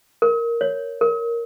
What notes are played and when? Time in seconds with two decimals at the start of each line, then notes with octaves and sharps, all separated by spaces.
0.22 A#4
0.61 C#5
1.01 A#4